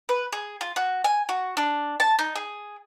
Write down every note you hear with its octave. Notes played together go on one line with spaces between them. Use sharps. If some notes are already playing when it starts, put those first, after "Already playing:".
B4
G#4
F4
F#4
G#5
F#4
D4
A5
D#4
G#4